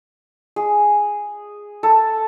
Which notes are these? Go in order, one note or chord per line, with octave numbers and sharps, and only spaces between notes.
G#4
A4